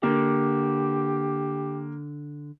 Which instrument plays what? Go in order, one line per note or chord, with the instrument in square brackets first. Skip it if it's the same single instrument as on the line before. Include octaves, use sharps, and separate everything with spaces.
[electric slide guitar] D3 [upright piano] A#3 [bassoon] G4